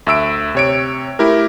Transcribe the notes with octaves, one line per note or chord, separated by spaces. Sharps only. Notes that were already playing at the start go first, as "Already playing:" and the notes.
D2 E5 E6 D7
C3 C#5 D7
A3 E4 G4 A#4